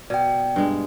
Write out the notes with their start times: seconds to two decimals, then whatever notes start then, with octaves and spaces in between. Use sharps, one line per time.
0.10 B2 D5 G5
0.56 G2 G#3